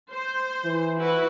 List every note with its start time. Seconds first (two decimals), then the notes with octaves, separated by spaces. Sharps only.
0.10 C5
0.65 E3
0.96 E4 F#4 B4